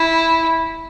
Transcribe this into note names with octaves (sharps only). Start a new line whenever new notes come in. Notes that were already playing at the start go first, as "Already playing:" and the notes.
Already playing: E4